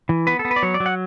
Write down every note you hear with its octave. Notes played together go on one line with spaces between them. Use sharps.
E3
B3 B4
A4
B3
B4
D5
F#3 C#5
D5
F#3
F#5